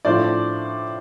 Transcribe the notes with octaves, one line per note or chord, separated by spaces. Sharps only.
A2 F3 A3 D4 C5 D5